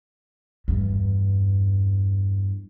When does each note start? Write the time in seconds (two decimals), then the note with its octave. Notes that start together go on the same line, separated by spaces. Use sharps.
0.68 E2 G2